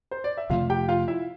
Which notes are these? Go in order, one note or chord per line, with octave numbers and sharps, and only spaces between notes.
C5
D5
E5
F2 C3 F3 A3 F4 F5
G4 G5
F4 F5
E4 E5